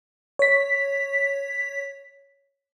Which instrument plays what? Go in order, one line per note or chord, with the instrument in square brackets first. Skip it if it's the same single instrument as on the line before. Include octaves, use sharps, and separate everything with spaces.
[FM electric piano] C#5 B6